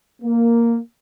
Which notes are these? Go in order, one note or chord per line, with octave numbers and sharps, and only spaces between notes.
A#3